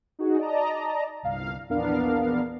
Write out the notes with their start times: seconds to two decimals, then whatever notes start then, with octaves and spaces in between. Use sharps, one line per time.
0.19 D#4 F#4 G#4
0.38 D5 D#5 A5 A#5
1.23 G1 C2 F5
1.69 A#1 E2 B3 D4 A#4 F5